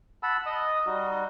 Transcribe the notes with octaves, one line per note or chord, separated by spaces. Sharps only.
F#5 A5 B5 E6
D#5 D#6
G3 D#4 F#4